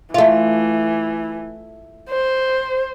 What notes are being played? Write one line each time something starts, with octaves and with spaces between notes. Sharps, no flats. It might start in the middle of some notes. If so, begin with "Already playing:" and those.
E3 A3 F4
C5